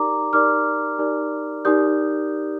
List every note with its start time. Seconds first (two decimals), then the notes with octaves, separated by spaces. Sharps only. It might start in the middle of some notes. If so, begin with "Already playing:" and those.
Already playing: D#4 G4 A#4 D5 A#5 D6
0.33 D#4 G4 A#4 D5 D6 F6
0.98 D#4 G4 A#4 D5
1.65 D#4 G4 A#4 D5 D#6 G6